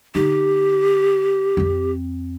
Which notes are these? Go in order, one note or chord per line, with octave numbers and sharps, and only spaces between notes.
D3 D#4 G4
F2 C4